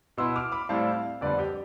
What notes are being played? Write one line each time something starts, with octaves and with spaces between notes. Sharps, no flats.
B2 B3 E4 C6 E6
D6 F6
B5 D6
A2 G3 C4 E4 F5 A5
F2 D3 G3 B3 B4 D5
G4